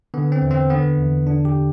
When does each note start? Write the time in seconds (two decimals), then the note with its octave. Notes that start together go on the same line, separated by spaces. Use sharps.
0.14 D3 B3
0.32 C4
0.42 E2
0.51 C4
0.70 D3 B3
0.98 E2
1.27 D3 D4
1.45 G4